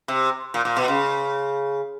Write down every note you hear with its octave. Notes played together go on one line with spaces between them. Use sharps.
C3
A#2
A#2
B2
C#3